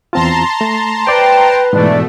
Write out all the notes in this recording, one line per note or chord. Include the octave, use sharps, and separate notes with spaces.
E2 C4 F4 A5 A#5 C6
A3
B4 C5 D5 G5
G#2 B2 E3 A3 D4 D5